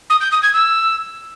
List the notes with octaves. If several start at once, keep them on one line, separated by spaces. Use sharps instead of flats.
D#6
G6
D#6
G#6
E6